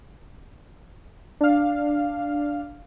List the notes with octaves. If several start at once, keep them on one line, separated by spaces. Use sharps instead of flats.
D4 F5